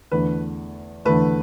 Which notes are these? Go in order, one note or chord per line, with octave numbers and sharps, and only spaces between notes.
E2 D3 A3 B4
E2 D3 A3 B4